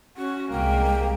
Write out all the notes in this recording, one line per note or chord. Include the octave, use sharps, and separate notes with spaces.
C#4 F#4
C2 G#3 A#3 G5